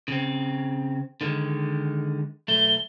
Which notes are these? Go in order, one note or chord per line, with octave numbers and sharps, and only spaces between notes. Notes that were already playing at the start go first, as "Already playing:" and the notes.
C#3 C4
D3 D#3 G#3
B1 A3 G7